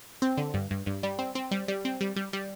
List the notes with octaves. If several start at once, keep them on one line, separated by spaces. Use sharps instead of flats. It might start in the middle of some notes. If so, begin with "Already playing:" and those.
C4
D3
G2
G2
G2
G3
C4
C4
G3
G3
C4
G3
G3
G3